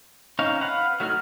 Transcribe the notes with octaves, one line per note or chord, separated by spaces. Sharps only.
C4 C#4 D#4 C#5 F5
B4 F5 F#5
F#3 A3 D#4 F#4 F6